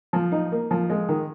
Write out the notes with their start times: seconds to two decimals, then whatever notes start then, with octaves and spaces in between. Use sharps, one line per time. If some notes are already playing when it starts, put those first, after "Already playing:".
0.13 F3
0.32 D#4
0.52 A#3
0.71 F3
0.90 G#3
1.09 D#3